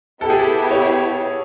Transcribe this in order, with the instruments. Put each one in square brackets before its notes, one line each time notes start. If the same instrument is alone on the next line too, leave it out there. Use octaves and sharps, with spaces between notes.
[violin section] B3 E4 G4 [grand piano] A4
[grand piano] G#4
A4
C#5